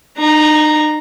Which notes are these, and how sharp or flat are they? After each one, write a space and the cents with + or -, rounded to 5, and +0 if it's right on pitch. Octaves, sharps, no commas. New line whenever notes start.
D#4 -40 A#5 +0